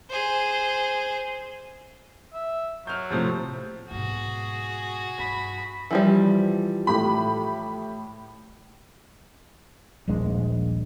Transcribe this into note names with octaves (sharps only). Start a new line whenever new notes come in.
G#4 C5
E5
F#3 F6 G6
A2 C3 F3
G#2 B2 F#4 G#4
G2 B5
E3 F3 G3
A2 G4 B5
D#1 A#1 G#3 D4